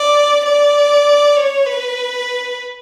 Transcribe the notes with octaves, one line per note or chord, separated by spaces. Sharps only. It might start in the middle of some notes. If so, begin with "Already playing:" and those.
Already playing: D5
D5
C#5
B4